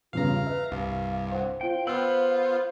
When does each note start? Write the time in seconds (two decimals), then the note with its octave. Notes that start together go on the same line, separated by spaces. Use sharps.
0.13 E2 G2 C#3 F4 F5 A#5
0.46 B4 E5
0.71 C2 G2 F5
1.31 C5 F#5
1.61 F4 C5 F5 G5
1.87 B3 F4 C5 B5 E6